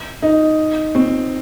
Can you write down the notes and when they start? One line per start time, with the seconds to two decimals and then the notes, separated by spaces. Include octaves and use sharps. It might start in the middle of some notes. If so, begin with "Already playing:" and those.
0.22 D#4
0.95 C4